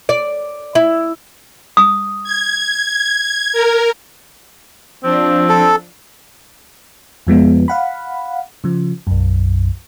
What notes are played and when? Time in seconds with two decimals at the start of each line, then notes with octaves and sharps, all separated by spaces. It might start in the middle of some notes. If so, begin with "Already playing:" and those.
0.09 D5
0.75 E4
1.77 D#6
2.24 G#6
3.53 A#4
5.03 F3 C4 D4
5.49 A4
7.27 F2 F3 G#3 B3
7.68 F5 F#5 B5
8.64 C#3 F3
9.07 B1 F#2